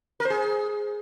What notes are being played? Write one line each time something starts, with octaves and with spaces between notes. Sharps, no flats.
A#4
C5
G#4